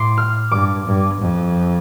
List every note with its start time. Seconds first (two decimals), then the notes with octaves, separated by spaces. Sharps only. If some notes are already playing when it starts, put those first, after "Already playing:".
Already playing: A2 C6 D6
0.18 F6
0.51 G2 D6
0.86 G2
1.21 F2